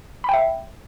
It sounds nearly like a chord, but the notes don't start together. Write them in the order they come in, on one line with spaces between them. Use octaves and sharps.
B5 G5 E5